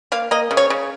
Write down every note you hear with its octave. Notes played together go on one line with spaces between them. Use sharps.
A#3 F5
A#3 D#5
C#3
C#5
C#3